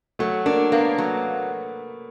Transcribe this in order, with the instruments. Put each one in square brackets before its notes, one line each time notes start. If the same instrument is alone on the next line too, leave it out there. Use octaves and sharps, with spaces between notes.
[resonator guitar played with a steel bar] F#3 [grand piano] A3
[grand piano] A#3 [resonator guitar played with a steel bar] D4
[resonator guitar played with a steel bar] A#3 [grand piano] B3
[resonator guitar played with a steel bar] F#3